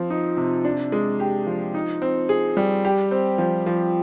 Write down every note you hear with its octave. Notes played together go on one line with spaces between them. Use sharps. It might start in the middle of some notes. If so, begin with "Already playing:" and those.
Already playing: F3 C4
D#4
C3
D4
G#3
G4
F3
D#4
C4
G#4
G3
G4
C4
F3
F3